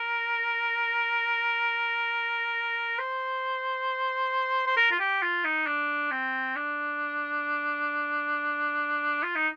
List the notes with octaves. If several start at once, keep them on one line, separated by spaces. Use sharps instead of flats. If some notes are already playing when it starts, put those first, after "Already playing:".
Already playing: A#4
C5
C5
A#4
F4
G4
F4
D#4
D4
C4
D4
F4
D#4